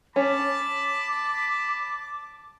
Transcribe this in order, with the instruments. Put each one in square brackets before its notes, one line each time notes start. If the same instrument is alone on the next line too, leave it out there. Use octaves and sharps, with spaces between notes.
[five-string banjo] C#4 [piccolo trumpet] A5 [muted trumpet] B5 [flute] D6